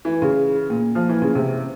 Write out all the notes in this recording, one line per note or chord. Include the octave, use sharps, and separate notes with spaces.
E3
C#3
A#2
F3
E3
C#3
C3